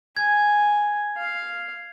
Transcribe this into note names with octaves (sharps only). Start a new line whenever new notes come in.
G#5 G#6
F5